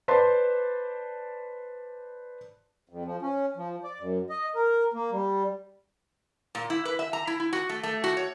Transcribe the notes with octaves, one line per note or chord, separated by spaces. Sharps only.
B4 C5 D5 A5 C6
F2
F3
C#4
F3
D5
F#2
D#5
A#4
A#3
G3
A#2
E4
B4
E5
A#5
E4
E4
F#4
A3
A3
F#4
C#5